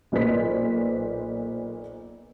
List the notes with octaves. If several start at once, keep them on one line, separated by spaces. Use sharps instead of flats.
B1 A#2 B4 C5 B6